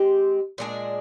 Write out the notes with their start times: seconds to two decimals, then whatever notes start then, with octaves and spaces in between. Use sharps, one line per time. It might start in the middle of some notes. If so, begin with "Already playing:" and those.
Already playing: G#3 C4 G4
0.58 A#2 G#3 D4 G#4